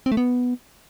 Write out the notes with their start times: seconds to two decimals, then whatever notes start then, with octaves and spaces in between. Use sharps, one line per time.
0.06 C4
0.12 A3
0.17 B3